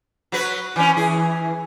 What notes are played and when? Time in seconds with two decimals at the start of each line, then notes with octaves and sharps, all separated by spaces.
0.32 F#3 F#4 B4
0.76 E3 C#4
0.97 E3 G#4